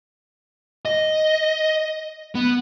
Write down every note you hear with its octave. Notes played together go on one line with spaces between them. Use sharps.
D#5
B3